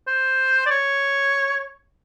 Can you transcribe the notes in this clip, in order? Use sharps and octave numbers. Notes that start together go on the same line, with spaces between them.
C5
D5
C#5